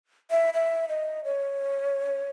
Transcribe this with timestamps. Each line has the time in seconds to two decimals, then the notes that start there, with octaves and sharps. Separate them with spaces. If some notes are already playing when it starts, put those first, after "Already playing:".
0.31 E5
0.54 E5
0.89 D#5
1.25 C#5